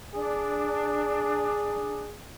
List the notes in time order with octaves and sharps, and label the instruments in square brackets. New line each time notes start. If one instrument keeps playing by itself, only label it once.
[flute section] D4 [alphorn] G#4